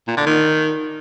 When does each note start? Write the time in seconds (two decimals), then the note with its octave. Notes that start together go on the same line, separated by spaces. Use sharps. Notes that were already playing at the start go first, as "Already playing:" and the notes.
0.08 A#2
0.17 D3
0.26 D#3